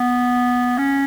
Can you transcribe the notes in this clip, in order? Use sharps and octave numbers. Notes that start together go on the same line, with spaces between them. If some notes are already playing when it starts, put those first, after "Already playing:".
Already playing: B3
C#4